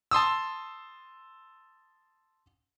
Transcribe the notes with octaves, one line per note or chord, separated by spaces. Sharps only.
A5 C6 D#6 E6